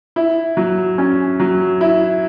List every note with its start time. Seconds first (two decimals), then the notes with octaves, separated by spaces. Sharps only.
0.16 E4
0.57 F#3
0.98 C#4
1.40 F#3
1.81 E4